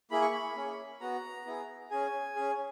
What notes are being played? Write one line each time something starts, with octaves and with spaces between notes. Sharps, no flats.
A#3 E4 G#4 B5
C#6
B5
A#3 C#4 G#4
B3 F#4 A#5
B3 E4 G#4
C#4 G#4 G#5
C#4 G#4